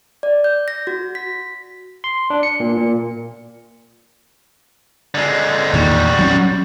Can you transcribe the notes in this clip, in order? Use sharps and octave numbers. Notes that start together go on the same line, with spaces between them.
D5
G6
A#6
F#4
B6
C6
D4
C#7
A#2
A#2
D3 G#3
E2 A#2 D#3 G3 F#4
F#3 C4 C#4